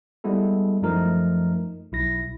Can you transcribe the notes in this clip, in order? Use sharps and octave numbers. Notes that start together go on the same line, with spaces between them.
G3 G#3 B3 E4 A4
F#2 F3 A3 D#4 A#4
B1 E4 A#6